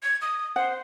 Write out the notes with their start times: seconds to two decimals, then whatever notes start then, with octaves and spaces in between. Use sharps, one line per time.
0.03 G#6
0.22 D#6
0.56 C5 F#5